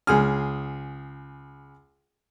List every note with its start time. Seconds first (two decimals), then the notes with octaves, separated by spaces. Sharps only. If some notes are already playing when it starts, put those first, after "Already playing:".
0.07 C#2 G#4 G#5 F6